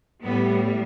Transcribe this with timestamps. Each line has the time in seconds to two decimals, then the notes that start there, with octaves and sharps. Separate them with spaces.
0.24 A2 G3 B3